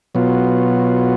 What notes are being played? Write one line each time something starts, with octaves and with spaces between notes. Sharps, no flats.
B2 F#3 B3 F4